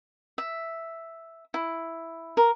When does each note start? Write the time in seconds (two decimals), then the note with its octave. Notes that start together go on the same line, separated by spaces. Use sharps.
0.38 E5
1.54 E4
2.37 A#4